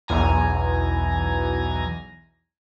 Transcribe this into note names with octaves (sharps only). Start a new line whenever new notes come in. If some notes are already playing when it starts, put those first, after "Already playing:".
B1 E2 G#5 A#5